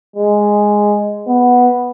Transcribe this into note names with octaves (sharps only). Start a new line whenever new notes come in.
G#3
B3